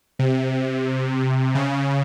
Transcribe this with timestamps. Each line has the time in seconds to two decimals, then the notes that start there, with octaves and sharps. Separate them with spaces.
0.19 C3
1.55 C#3